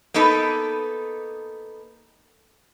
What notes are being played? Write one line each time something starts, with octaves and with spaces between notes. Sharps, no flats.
A#3 B3 D#4 A4 B4